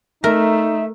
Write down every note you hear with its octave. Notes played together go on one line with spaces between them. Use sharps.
A3 D#4 A#4 E5